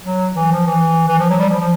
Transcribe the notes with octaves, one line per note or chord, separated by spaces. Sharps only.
F#3
E3
F3
E3
E3
F3
F#3
G3
F3
F3